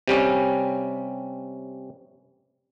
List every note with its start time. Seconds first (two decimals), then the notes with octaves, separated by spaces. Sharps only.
0.08 C3 G3 C#4